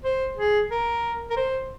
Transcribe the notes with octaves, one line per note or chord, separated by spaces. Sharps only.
C5
G#4
A#4
A#4
C5